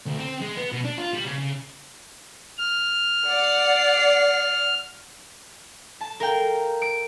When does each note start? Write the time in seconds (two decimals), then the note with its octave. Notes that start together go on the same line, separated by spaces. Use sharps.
0.06 D2
0.19 C4
0.42 G#3
0.57 B3
0.72 B2
0.84 D4
0.98 F4
1.13 G3
1.25 C#3
1.38 C#3
2.58 F6
3.26 D5 F#5 C7
6.01 A5
6.20 A#4 F5 G5
6.82 D7